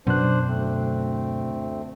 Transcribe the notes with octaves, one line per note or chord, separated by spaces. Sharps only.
F#2 B2 D4 C5 F#6
D2 A3 C4